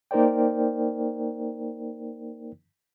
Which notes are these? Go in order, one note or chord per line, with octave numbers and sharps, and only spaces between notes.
A#3 D#4 A#4 C5 D5 G5